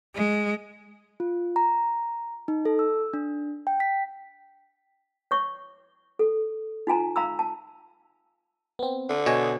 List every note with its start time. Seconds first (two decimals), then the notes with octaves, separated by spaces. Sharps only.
0.15 G#3
1.20 F4
1.56 A#5
2.48 D#4
2.65 A4
2.79 E6
3.13 D4
3.67 G5
3.80 B6
5.31 C#5 C#6
6.19 A4
6.87 D#4 F4 G#5 A#5
7.16 F5 A#5 B5 E6
7.39 A5
8.79 B3 C4
9.09 D3
9.26 B2 C#5 D#5 G#5